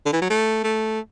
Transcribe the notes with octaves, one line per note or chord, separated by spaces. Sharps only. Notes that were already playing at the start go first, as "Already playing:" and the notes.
D3
E3
F#3
A3
A3